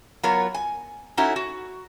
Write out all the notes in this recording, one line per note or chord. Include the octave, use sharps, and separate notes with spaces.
F#3 B3 F4 A#4 C#5
G#5
C#4 D#4 E4 F#4 A4 C#5
F#4